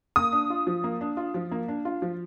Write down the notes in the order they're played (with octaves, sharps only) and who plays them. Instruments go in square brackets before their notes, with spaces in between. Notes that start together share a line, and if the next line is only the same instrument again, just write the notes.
[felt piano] A#3 [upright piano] D#6
[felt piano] D4
F4
F3
A#3
D4
F4
F3
A#3
D4
F4
F3